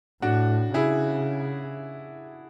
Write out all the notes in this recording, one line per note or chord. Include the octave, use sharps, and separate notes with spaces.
A2 D4 F#4
C#3 E4 G#4